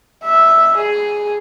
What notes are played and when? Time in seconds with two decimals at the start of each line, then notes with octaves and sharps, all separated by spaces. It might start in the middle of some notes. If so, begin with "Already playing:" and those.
0.24 E5
0.78 G#4